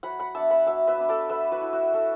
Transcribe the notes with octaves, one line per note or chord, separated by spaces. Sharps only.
F#3 F#5 B5
F#5 B5
B3 D4 E5 A5
F#5 B5
F#3 E5 A5
B4 E5
B3 D4
A4 D5
A3 B4 E5
F#4 B4
E4
F#4
A3 A4